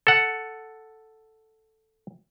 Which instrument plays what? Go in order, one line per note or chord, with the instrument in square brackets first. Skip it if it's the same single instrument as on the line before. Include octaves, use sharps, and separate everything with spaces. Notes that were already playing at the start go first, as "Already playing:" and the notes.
[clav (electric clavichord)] A4 F#5